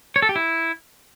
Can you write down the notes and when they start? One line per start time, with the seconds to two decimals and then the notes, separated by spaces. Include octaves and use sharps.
0.16 C#5
0.22 A4
0.29 G4
0.36 E4